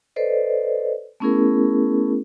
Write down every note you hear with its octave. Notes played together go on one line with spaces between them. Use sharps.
A4 B4 C5 D5 D#5
A3 B3 C#4 E4 G#4 A#4